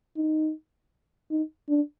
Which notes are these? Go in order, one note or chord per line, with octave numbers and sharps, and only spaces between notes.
D#4
D#4
D4